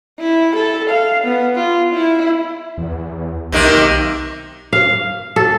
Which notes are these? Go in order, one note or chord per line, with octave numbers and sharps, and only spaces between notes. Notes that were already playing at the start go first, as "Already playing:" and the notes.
E4
A4
F5
B3
F4
E4
E2
B1 C3 D#3 A#3
F5
A4